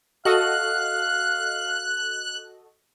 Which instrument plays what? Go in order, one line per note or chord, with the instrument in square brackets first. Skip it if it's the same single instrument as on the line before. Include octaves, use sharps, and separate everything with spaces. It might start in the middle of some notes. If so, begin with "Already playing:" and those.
[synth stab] F#4 A4 D#5 [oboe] F5 [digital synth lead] F#6